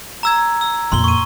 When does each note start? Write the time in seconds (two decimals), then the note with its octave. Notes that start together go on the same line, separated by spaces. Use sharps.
0.23 A#5 E6 G#6
0.61 E6
0.92 F2 A#2 C6 G7
1.04 C#6 D#7